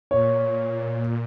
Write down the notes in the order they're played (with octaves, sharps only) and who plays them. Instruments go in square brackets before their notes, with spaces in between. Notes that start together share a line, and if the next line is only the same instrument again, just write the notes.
[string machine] A#2 [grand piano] C#5